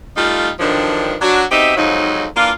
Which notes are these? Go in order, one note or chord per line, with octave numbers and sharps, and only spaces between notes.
G3 A3 D#4 F4
G2 D3 D#3 F3 F#3 D4
F#3 D4 F#4
B2 C4 D#4 G4 D#5 E5
F2 G#2 F3 F#3 D#4
E3 A#3 D4 F4